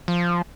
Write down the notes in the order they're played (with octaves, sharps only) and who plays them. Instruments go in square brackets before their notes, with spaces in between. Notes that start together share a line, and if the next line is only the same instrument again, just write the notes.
[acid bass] F3